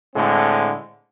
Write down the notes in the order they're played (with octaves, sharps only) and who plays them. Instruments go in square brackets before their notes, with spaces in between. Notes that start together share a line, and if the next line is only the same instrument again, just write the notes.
[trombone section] A2 D3 G#3 C4